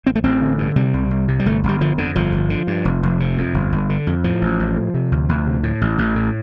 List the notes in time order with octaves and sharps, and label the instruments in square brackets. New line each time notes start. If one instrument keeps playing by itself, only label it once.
[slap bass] A1 C4
A3
A1 C4
D3
G2
C3 G3
C2
C2
C3
G3
G1 A3
G1
G3
D3 F3
F2 D3
G1 F3
G1
D3
G2
F1
F1
C3
F2
G1
G1
D3
F2
A2 F3
A1
A1
A2
C3
D2
D2
C3
A2
A1
A1
A2